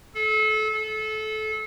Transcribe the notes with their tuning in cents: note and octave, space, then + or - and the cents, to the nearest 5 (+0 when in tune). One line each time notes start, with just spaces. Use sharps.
A4 -30
A4 -25